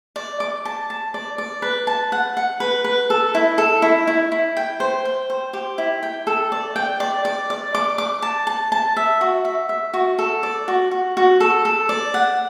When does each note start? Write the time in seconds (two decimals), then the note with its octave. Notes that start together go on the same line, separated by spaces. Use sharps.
0.16 D5
0.40 D6
0.65 A5
0.90 A5
1.14 D5
1.38 D5
1.62 B4
1.87 A5
2.12 F#5
2.37 F#5
2.60 B4
2.84 B4
3.10 A4
3.35 E4
3.58 A4
3.82 E4
4.07 E4
4.32 E4
4.57 G5
4.80 C5
5.05 G5
5.30 C5
5.53 G4
5.78 E4
6.03 G5
6.27 A4
6.52 D5
6.76 G5
7.00 D5
7.25 D5
7.50 D5
7.75 D6
7.98 D6
8.22 A5
8.47 A5
8.72 A5
8.97 E5
9.21 F#4
9.45 E5
9.69 E5
9.94 F#4
10.19 A4
10.43 D5
10.68 F#4
10.91 F#4
11.17 F#4
11.40 A4
11.65 A4
11.89 D5
12.14 F#5